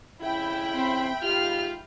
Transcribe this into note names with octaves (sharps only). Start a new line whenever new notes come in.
F2 C#3 E4 E5 G5 B5
C4 C6
G#2 F4 G4 F6